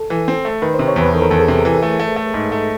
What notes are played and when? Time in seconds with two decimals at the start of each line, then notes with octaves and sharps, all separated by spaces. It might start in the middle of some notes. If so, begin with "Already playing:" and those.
Already playing: A4
0.10 E3
0.28 C4
0.45 A3
0.62 D#3 B4
0.74 C5
0.79 C3
0.88 C#5
0.96 E2 B4
1.13 D#3 A4
1.22 A#4
1.30 E2 A4
1.39 G#4
1.48 C3
1.65 E3
1.83 A3
2.00 A3
2.16 A3
2.34 G#2
2.52 A3